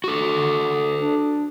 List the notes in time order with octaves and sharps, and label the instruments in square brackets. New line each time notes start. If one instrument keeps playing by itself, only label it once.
[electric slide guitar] F#4 A4
[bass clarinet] D3
D4